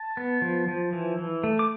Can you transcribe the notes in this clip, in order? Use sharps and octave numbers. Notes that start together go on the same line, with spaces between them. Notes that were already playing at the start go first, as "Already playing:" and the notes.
Already playing: A5
B3
F3
F3
E3
E3
A3
D6